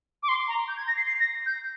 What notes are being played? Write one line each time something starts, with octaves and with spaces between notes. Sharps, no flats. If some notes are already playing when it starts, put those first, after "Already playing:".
D6
C6
A#5
G6
G#6
A#6
C7
C7
A#6
G6